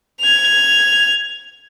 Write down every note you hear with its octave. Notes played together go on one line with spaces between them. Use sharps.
G#6 F7